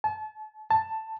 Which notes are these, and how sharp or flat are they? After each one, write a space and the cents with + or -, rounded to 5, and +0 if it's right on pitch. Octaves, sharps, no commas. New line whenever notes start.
A5 -30
A5 +10